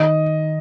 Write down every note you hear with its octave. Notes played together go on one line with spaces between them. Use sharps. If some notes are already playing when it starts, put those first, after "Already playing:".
Already playing: D#3 D#5